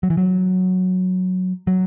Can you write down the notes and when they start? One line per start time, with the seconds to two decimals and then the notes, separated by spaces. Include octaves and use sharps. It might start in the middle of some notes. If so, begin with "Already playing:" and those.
0.03 F#3
0.10 E3
0.17 F#3
1.67 F#3